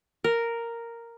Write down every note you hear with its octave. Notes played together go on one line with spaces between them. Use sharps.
A#4